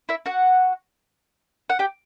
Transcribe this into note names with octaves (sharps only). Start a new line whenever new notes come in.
E4 E5
F#4 F#5
F#5
G4 G5